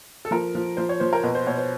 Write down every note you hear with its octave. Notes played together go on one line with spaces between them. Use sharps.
A4
F3 A#4
F3
F3 C5
C#5
F3 C5
A#4
B2 B4
C5
B2 C#5
C5